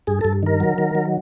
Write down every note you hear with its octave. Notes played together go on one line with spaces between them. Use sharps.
G2 G#4
G2 A4
D#3 A#4
F#3
D#3
F#3